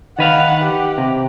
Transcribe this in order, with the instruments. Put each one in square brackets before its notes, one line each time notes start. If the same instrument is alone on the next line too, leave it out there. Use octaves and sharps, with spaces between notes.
[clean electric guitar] D#3 B4 F5 [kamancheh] F#5
[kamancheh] G4
[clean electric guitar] C3